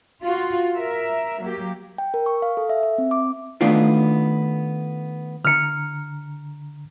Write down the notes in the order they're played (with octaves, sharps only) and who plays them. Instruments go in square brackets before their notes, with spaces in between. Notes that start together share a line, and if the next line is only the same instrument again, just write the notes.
[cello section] F4 F#4
A#4 E5
F#3 A#3 G4
[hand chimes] G5
A#4
C#6
F5
A4
E5
E5
C4
D6
[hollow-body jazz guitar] D#3 A3 B3 D4 F4
[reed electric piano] D3 A#5 [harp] F6 C#7